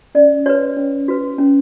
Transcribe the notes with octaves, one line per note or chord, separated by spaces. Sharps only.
C#4 D5
F#4 B4 C#5
C#4
F#4 B4
C#4